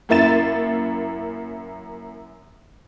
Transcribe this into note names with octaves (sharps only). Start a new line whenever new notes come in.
F#2 A#3 E4 A6 E7